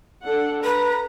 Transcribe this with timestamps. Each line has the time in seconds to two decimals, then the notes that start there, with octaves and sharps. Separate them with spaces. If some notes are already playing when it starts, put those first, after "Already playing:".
0.24 D4 A4 F#5
0.64 B4 A#5